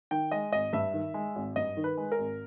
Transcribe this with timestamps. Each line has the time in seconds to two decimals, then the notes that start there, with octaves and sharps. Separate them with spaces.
0.11 D#3 G5
0.31 G#3 D#5
0.52 G#1 D#5
0.73 G2 E5
0.94 D#3
1.14 G#3
1.35 G#1
1.56 G2 D#5
1.77 D#3
1.84 B4
1.97 G#3
2.12 A#4
2.18 G#1